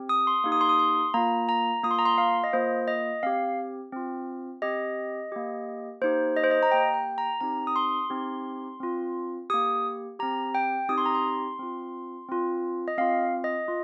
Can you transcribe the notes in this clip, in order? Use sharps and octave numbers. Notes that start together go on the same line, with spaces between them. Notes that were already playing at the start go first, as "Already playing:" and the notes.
Already playing: C4 G4
D#6
C6
A#3 D#4 G4
D#6
C6
D#6
C6
A#3 F4 A#5
A#5
A#3 F4 D#6
C6
A#5
C6
F5
D#5
A#3 F4 C5
D#5
C4 G4 F5
C4 F4
C4 G4 D#5
A#3 G4
A#3 D#4 G4 C5
D#5
C5
D#5
A#5
A#3 G4 G5
G5
A#5
C4 D#4 G4 A#5
D#6
C6
C4 D#4 G4
C4 F4
A#3 G4 D#6
C4 G4 A#5
G5
C4 D#4 G4 D#6
C6
A#5
C6
C4 F4
C4 F4
D#5
C4 F4 F5
D#5
F4